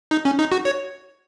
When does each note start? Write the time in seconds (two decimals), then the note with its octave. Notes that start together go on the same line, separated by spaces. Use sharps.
0.11 D#4
0.25 C#4
0.39 D#4
0.52 F#4
0.65 C#5